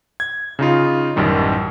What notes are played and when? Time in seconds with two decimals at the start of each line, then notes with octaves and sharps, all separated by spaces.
0.20 G#6
0.59 C#3 D#4 F4
1.16 A1 F#2 D#3 G3